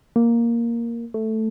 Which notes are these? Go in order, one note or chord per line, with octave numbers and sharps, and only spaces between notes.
A#3
A3